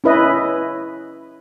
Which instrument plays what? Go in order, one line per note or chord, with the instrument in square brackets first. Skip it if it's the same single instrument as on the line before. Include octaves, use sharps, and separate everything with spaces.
[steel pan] C#4 E4 B4 D#5